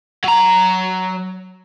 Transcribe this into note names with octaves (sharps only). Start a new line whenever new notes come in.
F#3 A#5